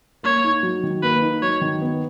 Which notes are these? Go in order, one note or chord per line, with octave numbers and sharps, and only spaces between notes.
A#3 C#5
D#4
F#3
D#3
A#3 B4
D#4
F#3 C#5
D#3
B3